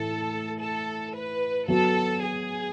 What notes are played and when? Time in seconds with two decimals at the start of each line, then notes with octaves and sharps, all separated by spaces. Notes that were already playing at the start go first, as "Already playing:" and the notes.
Already playing: A2 E3 A3 A4
0.61 A4
1.14 B4
1.68 F#3 B3 F#4 A4
2.22 G#4